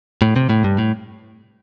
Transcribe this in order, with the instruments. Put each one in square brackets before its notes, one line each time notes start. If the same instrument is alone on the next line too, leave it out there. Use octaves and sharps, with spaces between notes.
[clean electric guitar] A2
C3
A2
G2
A2